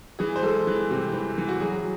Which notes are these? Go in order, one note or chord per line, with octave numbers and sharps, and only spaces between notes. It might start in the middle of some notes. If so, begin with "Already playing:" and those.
E3 G#4
C5
G#3 A4
E3
C3
E3
E3
F#4
F#3 G#4